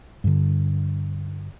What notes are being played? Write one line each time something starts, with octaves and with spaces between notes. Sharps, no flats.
G2 D3